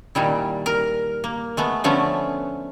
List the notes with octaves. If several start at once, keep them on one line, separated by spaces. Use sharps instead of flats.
A#2 D#3 G3 E4
A#4
A#3
G#3 A3 B3
D3 F3 A3 B3 C#4